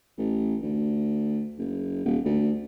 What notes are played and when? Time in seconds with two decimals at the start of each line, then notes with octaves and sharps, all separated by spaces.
0.18 A1
0.62 D2
1.58 F#1
2.05 D#1
2.25 D2